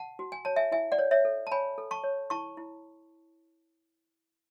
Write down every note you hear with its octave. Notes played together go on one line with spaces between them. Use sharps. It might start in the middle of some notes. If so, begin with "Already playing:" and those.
Already playing: F#5 A5
F#4
G#5
C#5 A5
E5 G#5
E4 E5 G#5
D5 F#5
C#5
C#5 E5
A4
A5
C#5 G#5 B5
A4
A5 C#6
C#5
E4 A5 C#6
E4